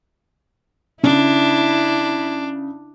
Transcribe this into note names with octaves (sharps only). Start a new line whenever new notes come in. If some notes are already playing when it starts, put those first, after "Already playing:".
C#3 D4 E4